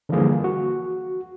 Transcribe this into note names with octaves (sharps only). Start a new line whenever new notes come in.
D3 E3 F3 G3 A#3 G#4
F#4